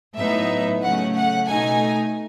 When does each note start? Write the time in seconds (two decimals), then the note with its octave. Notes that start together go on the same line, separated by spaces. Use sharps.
0.16 A2 F#3 B3 D#4 E5
0.81 C#3 F#3 A3 C#4 F#5
1.14 F#5
1.47 B2 A3 D#4 G#5